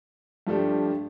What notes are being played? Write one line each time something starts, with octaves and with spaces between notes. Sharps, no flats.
G2 F3 A3 D4 G4